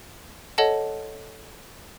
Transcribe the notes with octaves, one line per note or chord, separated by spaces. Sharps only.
A4 C#5 D#5 F#5 A5